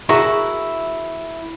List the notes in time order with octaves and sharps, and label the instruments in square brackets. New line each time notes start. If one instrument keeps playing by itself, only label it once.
[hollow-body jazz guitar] E4 F#4 G#4 A#4 E5